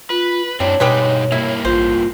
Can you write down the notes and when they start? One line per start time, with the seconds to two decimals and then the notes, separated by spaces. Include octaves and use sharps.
0.10 F4 B4
0.60 F#2 G3 C4 D4 E4 C#5
0.80 G2 B2 G3 G#3 D#4 B4
1.32 G2 A#3 E4
1.65 A1 F4 C5